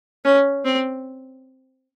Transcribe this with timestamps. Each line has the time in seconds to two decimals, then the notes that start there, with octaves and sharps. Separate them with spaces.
0.25 C#4
0.65 C4